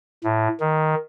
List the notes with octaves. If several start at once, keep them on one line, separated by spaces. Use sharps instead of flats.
A2
D#3